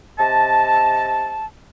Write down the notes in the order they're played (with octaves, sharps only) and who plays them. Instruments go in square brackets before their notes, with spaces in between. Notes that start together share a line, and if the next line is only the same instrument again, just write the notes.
[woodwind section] C3 D#5 A5